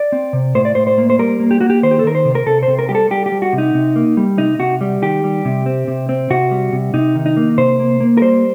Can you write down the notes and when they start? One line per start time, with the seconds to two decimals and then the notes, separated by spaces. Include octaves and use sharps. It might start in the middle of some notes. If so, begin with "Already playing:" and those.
Already playing: D5
0.12 C4
0.33 C3
0.55 A2 C5
0.65 D5
0.75 A2 C5
0.87 C5
0.98 A#3
1.10 C5
1.19 G3 A#4
1.40 A#3
1.51 G4
1.61 A#3 F#4
1.70 G4
1.83 D#3 C5
1.91 G4
1.99 A4
2.04 D#3 A#4
2.15 C5
2.25 C3
2.35 A#4
2.46 C3 A4
2.63 C5
2.68 C3
2.79 A#4
2.89 G3 G4
2.95 A4
3.11 G3 G4
3.26 G4
3.32 G3
3.42 F#4
3.53 C3
3.58 D#4
3.74 C3
3.96 A#3
4.17 G3
4.38 C3 D#4
4.59 C3 F#4
4.81 G3
5.02 D#3 G4
5.24 G3
5.45 C3
5.66 C4
5.88 C3
6.09 C4
6.30 C3 F#4
6.51 G3
6.73 C3
6.94 C3 D#4
7.15 D#3
7.26 D#4
7.37 A#3
7.58 C3 C5
7.80 A#3
8.00 A#3
8.17 A#4
8.21 G3 C5